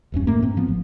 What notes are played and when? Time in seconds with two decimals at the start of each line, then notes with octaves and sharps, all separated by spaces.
0.12 E1 E2 G2 C#4
0.27 A2 A3 A#3
0.42 G#2 C4
0.57 F3 B3
0.68 G#1